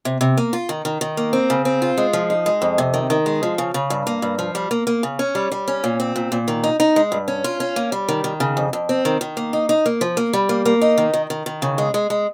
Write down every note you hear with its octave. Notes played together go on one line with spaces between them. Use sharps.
C3
C3
A#3
F4
D#3
D#3
D#3
A#3
C4
C#3
C4
F4
G#3
F3
D#4
G#3
F2
C3
D#3
D#3
G#3
F3
C#3
C#3
G2
A#3
G2
F3
G3
A#3
A#3
C#3
C#4
G3
G3
C#4
A#2
C4
A#2
A#2
D#3
D#4
D#4
G#3
G2
C#4
F4
C#4
A#3
G3
D#3
D#3
C#3
F2
F2
C4
D#3
D#3
A#3
D#4
D#4
A#3
F3
A#3
G3
A#3
A#3
D#4
D#3
D#3
D#3
D#3
C#3
G#3
G#3
G#3